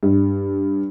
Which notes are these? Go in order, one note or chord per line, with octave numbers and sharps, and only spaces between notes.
G2